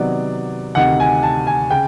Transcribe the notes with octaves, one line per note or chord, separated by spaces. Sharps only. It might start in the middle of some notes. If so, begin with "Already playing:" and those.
Already playing: C3 D#3 F#3 B3 D5
D2 C3 D#3 F#5
G#5
A5
G#5
C#3 G5